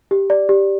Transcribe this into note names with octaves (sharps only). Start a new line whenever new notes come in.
G4
D5
G4